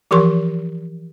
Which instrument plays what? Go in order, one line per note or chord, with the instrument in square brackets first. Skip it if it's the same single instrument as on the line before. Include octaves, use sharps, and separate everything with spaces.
[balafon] E3 F3 G4 A#4 C6 C#6